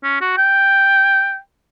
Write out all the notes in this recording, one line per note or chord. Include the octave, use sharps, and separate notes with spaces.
C#4
F#4
G5